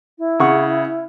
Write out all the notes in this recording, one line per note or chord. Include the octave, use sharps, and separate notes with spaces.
E4
C#3 F#5 C#6